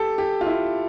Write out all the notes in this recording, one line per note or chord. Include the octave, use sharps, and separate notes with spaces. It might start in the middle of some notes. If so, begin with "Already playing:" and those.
Already playing: G4 A4
G4
F4
E4